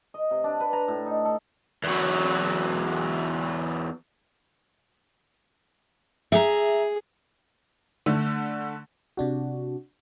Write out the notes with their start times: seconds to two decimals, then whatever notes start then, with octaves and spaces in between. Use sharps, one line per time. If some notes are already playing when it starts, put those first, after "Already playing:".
0.14 D#5
0.31 C3
0.44 D4
0.60 B4
0.73 A#5
0.88 A2
1.06 D#4
1.25 A4
1.84 E2 F#3
6.32 G#4 E5 A#5
8.06 D3 A3
9.17 C3 D4 F#4